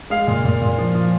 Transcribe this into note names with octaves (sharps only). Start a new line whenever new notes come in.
G#3 F5
A#2
A#2
A#2
F3
F3